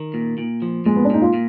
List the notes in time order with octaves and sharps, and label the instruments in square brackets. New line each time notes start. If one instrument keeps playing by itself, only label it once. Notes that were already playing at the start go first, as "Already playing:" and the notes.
Already playing: [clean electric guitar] D#3
A#2
A#2
F3
[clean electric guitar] A#2 [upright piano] G#3
[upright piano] B3
D4
[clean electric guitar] A#2 [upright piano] D#4
[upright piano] F4
[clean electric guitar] A#2